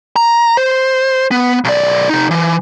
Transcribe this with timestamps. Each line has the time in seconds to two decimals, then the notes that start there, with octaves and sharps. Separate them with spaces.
0.16 A#5
0.57 C5
1.31 B3
1.64 B1 D5
2.09 C3 D#4
2.31 E3